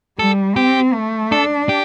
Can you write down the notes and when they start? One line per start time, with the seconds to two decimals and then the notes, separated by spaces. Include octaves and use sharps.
0.19 G3 A4
0.56 C4 G4
0.94 A3
1.31 D4 A4
1.69 G4